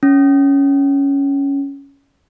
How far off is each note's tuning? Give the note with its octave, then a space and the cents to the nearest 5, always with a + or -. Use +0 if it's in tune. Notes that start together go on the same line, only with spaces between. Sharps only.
C#4 +5